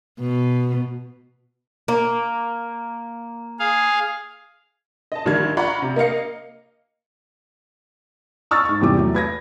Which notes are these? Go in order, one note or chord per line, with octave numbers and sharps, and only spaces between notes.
B2
A#3
G#4 F5
D#5 A5
A#1 D#3 G3 G#6
F4 D5 F#5 A#5 B5 C#6
C3
A#3 D#5 F5 C#7
C#6 E6 F6 A6
G#2 C#6
E2 C3 G3 G4 D6
E2 F#3 A3
B4 G#6 A#6